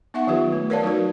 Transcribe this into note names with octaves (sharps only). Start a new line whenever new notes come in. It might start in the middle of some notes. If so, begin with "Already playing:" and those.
B3 D#4 E5 F#5 C#6
D#3 F#3 F4 G4 B4
D#3 A3
A#4 B4 C#5 D5 F5 A5
F#3 D#4 E4 F#4 A#4